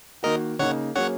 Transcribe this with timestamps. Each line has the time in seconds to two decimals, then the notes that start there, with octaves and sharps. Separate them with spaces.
0.23 D#3 A#3 F#4 A#4 D#5
0.59 C#3 A#3 D#4 C#5 F#5
0.95 F#3 A#3 C#4 G#4 C#5 F#5